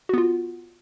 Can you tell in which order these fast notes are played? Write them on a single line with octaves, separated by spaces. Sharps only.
F#4 B3 F4